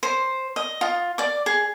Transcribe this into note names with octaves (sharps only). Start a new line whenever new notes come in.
C5
D#5
F4
D5 D6
G#4